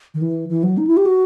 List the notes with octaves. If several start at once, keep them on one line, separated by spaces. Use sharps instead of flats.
D#3
E3
E3
F#3
D#4
E4
G4
F#4